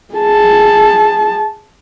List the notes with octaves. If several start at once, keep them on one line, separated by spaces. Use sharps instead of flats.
G#4 A5